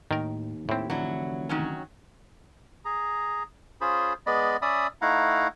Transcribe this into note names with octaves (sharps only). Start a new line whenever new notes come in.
D#2 A2 D#3 A#4
A2 C4 E4 G4
F1 D3 E3 F#3 D4 E4
D#3 F#3 C#4
G#4 A#5
C#4 F4 G#4 C5 B5
G#3 B3 D5 D#5 B5
C#4 D5 E5 B5 D#6
A3 D#4 E4 F5 F#5 A#5